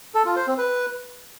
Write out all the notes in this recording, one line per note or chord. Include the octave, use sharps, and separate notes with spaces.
A4
F4
C5
C4
B4